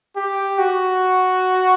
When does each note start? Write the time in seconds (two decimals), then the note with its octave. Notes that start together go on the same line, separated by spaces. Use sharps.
0.16 G4
0.58 F#4